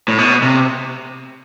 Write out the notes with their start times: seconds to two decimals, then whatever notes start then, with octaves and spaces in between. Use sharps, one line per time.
0.08 A2
0.18 B2
0.42 C3